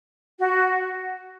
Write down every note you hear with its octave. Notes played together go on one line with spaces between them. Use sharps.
F#4